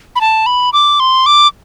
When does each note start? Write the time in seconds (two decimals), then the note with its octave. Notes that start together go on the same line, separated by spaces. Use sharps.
0.16 B5
0.21 A5
0.46 B5
0.73 D6
1.00 C6
1.26 D6